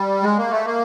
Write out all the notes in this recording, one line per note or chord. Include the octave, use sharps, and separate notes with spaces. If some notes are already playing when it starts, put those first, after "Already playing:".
Already playing: G3
G#3
A#3
A3
A#3